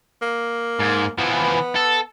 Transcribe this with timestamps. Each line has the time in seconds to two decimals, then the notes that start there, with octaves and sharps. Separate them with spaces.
0.22 A#3
0.79 G#2
1.18 E3 F3 B3
1.76 A4